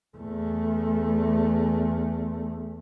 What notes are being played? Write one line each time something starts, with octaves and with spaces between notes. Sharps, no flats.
E2 A3